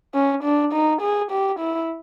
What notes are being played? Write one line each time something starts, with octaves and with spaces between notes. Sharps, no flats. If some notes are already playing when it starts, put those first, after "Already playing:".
C#4
D4
D#4
G#4
G4
E4